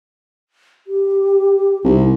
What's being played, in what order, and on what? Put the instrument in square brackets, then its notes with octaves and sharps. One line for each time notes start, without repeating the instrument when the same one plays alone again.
[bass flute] G4
[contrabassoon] C2 [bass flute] D#4